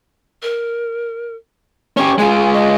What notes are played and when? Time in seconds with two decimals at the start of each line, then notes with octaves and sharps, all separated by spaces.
0.42 A#4
1.97 C#4 G4 C#6
2.18 G#3 F4 G#5
2.53 D#5